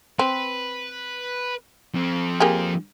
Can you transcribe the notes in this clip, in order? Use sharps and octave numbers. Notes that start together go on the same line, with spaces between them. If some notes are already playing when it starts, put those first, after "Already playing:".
C4 B4
F3 C4
A#3 G4 G#4